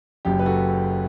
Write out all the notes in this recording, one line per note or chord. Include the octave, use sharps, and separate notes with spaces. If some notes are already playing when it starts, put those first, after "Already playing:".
F#1 F#2 F#3 G4
B4
F#4 A4